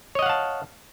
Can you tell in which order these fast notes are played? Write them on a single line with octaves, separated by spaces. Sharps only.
C#5 D#5 F#5 F5 A5